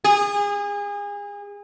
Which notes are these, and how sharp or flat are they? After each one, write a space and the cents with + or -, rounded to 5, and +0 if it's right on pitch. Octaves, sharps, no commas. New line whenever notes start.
G#4 -30